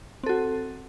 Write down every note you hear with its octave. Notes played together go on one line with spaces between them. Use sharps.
C4 F#4 A4